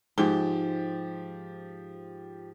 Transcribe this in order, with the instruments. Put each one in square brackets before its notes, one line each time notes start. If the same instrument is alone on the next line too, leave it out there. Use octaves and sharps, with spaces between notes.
[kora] G#2 [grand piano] F3 G4 G7